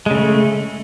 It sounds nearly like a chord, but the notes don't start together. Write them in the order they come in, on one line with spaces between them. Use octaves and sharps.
G#3 C#3 A3